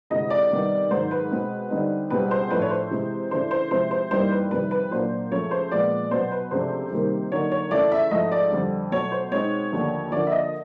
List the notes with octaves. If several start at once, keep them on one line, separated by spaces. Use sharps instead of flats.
D2 C3 E3 G#3 D#5
D5
C3 D#3 G3 B3 D#4
G#2 D#3 F#3 C5
B4
B2 G#3 C4
D3 G3 C4 D#4
C#2 B2 G3 C4 B4
C5
A2 F3 A3 D4 B4
C#5
C5
C3 E3 G#3 C4
C#3 E3 A3 D4 C5
C5
C3 F3 G#3 C4 E4 C5
C5
G2 E3 G3 A#3 D#4 C5
B4
F2 C3 D#3 G3 C4 B4
B4
A#2 F#3 A#3 D4 F4 C5
C#2 C#3 F3 A3 C#5
C5
A#2 F3 G#3 B3 D5
B2 F#3 B3 C5
B4
C#2 C3 F3 A3 D4 C5
C3 D#3 G3 A#3
D3 F#3 A#3 D#4 C#5
C#5
C#3 E3 A3 C#4 D5
E5
G#2 F3 A3 D#5
D5
F2 D3 G3 C4
B2 F#3 A3 C#5
C5
B2 G#3 C4 D#4 C#5
D#2 D3 F3 A3
D3 F3 A#3 D4 F4 D5
E5
D#5